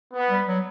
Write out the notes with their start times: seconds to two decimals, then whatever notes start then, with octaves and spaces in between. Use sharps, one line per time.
0.14 B3
0.30 G3
0.47 F#3